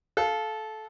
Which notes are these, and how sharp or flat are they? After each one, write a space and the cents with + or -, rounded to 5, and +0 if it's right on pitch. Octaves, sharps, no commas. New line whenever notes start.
A4 -20 F5 +0